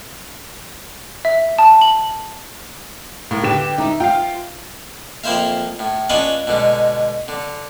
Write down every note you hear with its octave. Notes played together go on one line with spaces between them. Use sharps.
E5
A5
F#7
A2 A#3
D3 G4 B4 E7
D#4 E4
F4 F5 G5
F2 A#3 E4 C5 E5 F5
A2
C#4 D4 F4 F#4 B4 D#5
B2 D3 G#3
D3